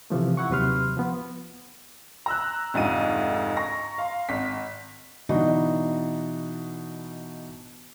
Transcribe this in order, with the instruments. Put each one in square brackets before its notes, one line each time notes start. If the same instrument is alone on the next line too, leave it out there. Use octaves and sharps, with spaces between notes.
[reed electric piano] C3 E3 F3 A3
E4 F#5 C#6
D#2 C3 F#3 B4 C6 F6
F3 B3
[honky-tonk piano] A#5 E6 F#6
F1 D2 G#2 F4 D#7
A#5 C#6 A#6
F5 C6
G#1 B6
[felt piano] B2 E3 B3 D4 D#4 F#4